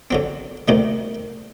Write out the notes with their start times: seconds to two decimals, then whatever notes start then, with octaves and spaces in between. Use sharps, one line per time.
0.11 D3 F#3 C4
0.68 D2 C3 D#3 G3